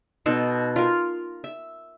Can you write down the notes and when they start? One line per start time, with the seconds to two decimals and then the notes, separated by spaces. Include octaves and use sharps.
0.26 B2 D#4 A4 C6
0.76 F4 A#4
1.44 E5